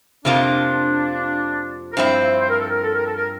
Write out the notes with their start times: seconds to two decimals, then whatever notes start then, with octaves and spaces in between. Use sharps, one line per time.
0.25 F2 C3 F3 A#3 D4 F4
1.92 A#4
1.96 G2 F3 C4 E4 C5
2.40 C5
2.49 A#4
2.59 A4
2.69 A#4
2.83 A4
2.94 A#4
3.04 A4
3.16 A#4